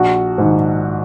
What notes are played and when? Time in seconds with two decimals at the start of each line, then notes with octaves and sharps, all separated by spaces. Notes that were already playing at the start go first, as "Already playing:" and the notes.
Already playing: A#1 F#4
0.38 G#2 D#3